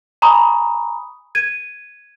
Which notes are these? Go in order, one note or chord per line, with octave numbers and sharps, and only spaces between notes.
G#5 A#5 B5 C#6 D#6
G#6 D#7